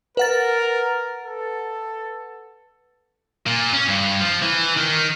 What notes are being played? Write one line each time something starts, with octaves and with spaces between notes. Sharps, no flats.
A#4 B4 F#5 A6
A4
A#2
C#4
G2
F3
E3
D#3